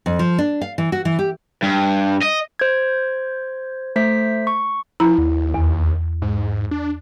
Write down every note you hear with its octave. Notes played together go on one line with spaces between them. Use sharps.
F2
F3
D4
F5
E3
F#4
E3
G4
G2
D#5
C5 G#6
A3 C5 B6
C#6
F3 E4 A#5 B5
D#2
E2
G#2
D4